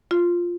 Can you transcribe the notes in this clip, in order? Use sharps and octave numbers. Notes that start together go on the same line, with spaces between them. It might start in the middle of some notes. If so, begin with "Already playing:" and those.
F4